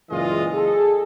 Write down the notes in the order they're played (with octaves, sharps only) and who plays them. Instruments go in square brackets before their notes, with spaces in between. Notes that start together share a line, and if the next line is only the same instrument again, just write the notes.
[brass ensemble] F#1 A#2 E3 G#3 F4 D#5
G#4 A4